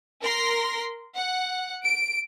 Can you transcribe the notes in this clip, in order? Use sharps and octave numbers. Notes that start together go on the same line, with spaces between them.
A#4 C6 A#6
F#5
D7